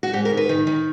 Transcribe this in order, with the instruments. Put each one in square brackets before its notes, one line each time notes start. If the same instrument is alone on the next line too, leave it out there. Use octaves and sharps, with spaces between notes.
[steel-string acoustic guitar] F#4
G#2 G4
A#4
D#3
B4
D#3
D#3